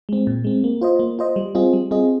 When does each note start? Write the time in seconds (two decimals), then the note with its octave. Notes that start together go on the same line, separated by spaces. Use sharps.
0.09 G#3 C4
0.27 A#2
0.44 G#3 C4
0.64 A#3
0.81 F4 C5 D#5
0.99 A#3
1.19 F4 C5 D#5
1.36 G3
1.55 C4 F4 G#4 D#5
1.73 G3
1.91 C4 F4 G#4 D#5